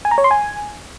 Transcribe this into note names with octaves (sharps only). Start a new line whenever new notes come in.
G#5
A#5
C#5
C6
G#5